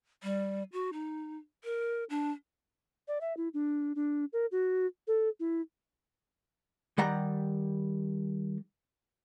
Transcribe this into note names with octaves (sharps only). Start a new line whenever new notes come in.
G3
F#4
D#4
A#4
D4
D5
E5
E4
D4
D4
A#4
F#4
A4
E4
D#3 G3 F#5 A#5